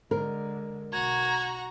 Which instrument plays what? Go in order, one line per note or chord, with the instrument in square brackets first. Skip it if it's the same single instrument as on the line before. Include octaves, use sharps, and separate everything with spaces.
[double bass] D3 G#3 [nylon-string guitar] A#4
[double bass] B1 [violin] F#4 A#5 [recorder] G#6